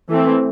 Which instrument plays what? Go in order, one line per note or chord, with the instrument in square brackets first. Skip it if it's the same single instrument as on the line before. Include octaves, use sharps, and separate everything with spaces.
[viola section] E3 A3 C4